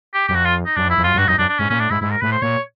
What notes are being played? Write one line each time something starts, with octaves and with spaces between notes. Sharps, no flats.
G4
F#2 G4
F2 F#4
F4
D#4
F#2 D4
F2
E4
F2
F#2 F4
F#2
G2 F#4
F#2 D#4
F#2 D4
D4
G#2 C#4
A#2 C#4
A2 D4
G#2 E4
G#2 E4
A#4
A2 B4
C5
A#2 C#5